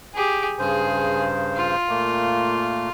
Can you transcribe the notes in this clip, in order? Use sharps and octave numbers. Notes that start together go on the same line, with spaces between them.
G4 G#4
G2 C#3 G#4 C5
F4
A#2 A3 A#3